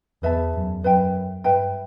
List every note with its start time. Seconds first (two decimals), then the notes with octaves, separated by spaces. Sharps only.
0.23 E2 B4 E5 A5
0.54 F#2
0.83 F#2 B4 E5 G5
1.44 G2 B4 E5 G5